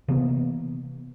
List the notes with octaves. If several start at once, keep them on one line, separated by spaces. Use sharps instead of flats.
C3 E3 A#3 B3